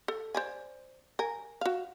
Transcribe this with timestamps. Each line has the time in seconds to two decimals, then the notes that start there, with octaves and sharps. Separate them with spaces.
0.08 A4
0.35 C5 D5 G#5
1.19 A#4 G#5
1.61 F#4 F5